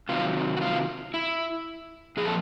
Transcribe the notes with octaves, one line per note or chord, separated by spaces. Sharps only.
C3 D#3 F#3 F4
F#4
F4
E4
A#2 F3 G#4
A4